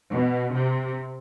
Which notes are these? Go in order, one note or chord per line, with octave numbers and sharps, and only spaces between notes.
B2
C3